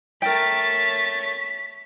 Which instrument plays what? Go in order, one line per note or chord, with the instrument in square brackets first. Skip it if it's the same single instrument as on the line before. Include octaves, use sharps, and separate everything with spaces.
[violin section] A3 C#5 A6 [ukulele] A#4 G5 [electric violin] B6